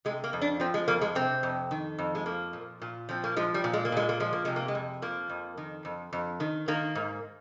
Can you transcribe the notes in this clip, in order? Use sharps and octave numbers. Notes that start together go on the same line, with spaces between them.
C3 G#3
A#3
F2
D4
F3 C4
G#3
F2 A#3
G#3
C3 C4
F2
D#3
F2
G#3
F3 A#3
A#2
A#2
F3 C4
A#3
F3 G#3
G3
A#2
G#3
A#3
A#2 G#3
A#3
F3 G#3
A#3
C3 G#3
A#3
G#3
F2
F3 A#3
F2
D#3
F2
F2
D#3
D#3 A#3
G#2